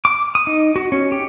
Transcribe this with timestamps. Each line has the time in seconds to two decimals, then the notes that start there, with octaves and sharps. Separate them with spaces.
0.05 D6
0.35 D#6
0.47 D#4
0.76 F#4
0.92 C#4
1.12 G4